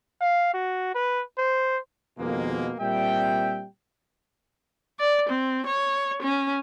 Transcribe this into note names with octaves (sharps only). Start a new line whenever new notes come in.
F5
F#4
B4
C5
F2 B2 D#3 G#3 A#3
A#2 G3 C4 E5 G5
D5
C4
C#5
C#4